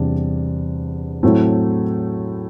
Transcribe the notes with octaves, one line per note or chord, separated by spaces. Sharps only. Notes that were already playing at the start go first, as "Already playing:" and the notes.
Already playing: E2 C3 G3 D4
A2 F#3 A3 C4